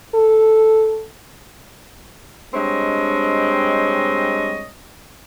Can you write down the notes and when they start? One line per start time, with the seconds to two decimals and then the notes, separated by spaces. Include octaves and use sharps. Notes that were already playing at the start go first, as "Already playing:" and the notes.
0.14 A4
2.54 G2 G#3 C4 C#5 D#5